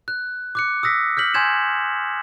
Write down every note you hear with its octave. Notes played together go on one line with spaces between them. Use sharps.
F#6
D6 F#6 C#7
D#6 E6 A#6 B6
F6 G6 B6 F#7
G#5 C6 G6 G#6 E7